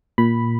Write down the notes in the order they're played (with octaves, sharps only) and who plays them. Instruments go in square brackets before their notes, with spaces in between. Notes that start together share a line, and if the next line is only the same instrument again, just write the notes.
[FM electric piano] A#2 B5